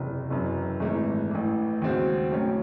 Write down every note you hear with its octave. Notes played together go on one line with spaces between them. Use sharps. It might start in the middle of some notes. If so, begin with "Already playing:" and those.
Already playing: F#1 E2 C3
F#1 F#2 E3
G#1 G#2 E3 A3
A1 A2 E3
D#2 C#3 G#3 C4 F#4
A1 A2 F#3 C#4